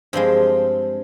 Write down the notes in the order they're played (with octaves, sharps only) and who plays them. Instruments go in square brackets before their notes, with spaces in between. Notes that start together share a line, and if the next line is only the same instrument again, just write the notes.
[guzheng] G2 F3 G#3 C4